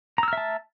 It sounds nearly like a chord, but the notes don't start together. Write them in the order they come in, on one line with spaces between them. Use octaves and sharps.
A#5 E6 F6 E5 A5